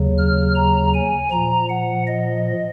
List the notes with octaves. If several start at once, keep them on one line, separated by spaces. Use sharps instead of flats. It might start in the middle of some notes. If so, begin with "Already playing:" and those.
Already playing: D#2 C#3 F#3
F6
A#5
G#5
A#2 F3 A#5
F#5
D#5